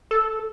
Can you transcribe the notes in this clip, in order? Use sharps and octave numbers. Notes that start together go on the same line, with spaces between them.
A4